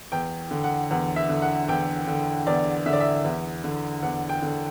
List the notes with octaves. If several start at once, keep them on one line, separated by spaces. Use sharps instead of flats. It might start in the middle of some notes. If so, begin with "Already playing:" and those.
E2 G5
D3
F#5
E2 F#5
E5
D3
F#5
E2 G5
D3
E2 D5
D3 E5
D5
E5
E2
D3
E2 F#5
G5
D3